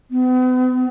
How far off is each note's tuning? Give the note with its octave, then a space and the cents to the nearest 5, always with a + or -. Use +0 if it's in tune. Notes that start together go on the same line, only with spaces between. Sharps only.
B3 +45